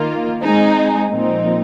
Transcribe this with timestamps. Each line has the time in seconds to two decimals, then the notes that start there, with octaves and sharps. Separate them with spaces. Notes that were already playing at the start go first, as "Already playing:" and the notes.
Already playing: D#3 A#3 F4
0.43 G#3 C4 D#4 G#4
1.10 A#2 F3 C4 D#4